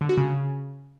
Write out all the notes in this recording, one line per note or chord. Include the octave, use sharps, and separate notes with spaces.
D3
F#4
C#3